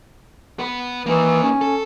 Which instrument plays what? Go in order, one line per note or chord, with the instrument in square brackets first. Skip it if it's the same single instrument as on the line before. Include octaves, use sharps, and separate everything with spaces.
[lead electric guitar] B3 B4
[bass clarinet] E3 [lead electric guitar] A#3 D#4
[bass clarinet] C#4
[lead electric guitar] A4